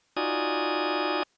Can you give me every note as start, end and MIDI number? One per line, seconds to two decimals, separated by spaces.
0.17 1.23 63
0.17 1.23 65
0.17 1.23 66
0.17 1.23 74
0.17 1.23 80
0.17 1.23 87